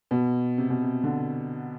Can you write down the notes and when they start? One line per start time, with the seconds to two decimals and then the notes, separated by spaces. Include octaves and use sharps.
0.11 B2
0.58 C3
0.70 B2
0.82 C3
1.03 D3